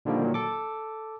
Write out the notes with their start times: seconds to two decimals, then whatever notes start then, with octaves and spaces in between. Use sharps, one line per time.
0.05 A#2 D3 D#3 F3 G3 A#3
0.23 A#2 D#3 F#3
0.34 A4 D6